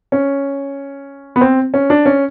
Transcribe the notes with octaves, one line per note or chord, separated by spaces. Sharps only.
C#4
B3
C4
C#4
D4
C#4